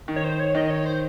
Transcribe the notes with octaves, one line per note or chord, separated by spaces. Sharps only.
D#3
C#5
C5
C#5
D#3 D#5
C#5
C5